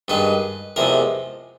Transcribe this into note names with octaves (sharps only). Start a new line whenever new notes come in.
G2 D#3 G#3 B4
E2 C3 F3 G#3 A#4